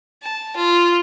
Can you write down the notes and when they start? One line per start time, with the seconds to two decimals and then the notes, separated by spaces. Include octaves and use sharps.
0.23 A5
0.57 F4